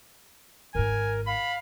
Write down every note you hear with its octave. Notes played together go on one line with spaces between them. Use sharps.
G#1 G#2 A#4 G#5
F5 B5